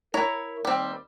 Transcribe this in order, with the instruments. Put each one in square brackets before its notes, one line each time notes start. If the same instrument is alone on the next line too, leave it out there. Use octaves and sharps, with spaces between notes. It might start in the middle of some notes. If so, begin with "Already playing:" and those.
[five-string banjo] E4 C#5 A#5 [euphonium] A#4
[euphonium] D#2 [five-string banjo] G3 C4